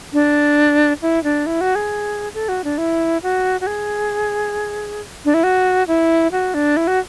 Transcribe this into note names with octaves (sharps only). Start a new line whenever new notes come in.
D4
E4
D4
E4
F#4
G#4
A4
F#4
D4
E4
F#4
F#4
G#4
D4
E4
F#4
E4
F#4
D4
E4
F#4